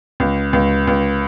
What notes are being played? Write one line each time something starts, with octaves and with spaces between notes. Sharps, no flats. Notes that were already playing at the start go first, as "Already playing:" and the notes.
C#2
C#2
C#2